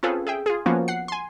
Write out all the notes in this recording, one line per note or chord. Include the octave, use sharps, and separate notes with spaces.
C4 C#4 F4 G#4 A4 B4
G#4 E5 G5
F4 G#4
F3 A#3 B3 C#4 F4 F#4
F#5 C7
G#5 C6